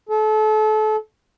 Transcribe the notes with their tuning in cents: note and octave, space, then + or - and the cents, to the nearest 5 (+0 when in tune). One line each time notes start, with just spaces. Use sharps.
A4 -30